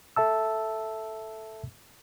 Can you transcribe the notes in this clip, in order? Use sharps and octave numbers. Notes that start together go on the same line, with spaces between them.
A4 E5 A5 E6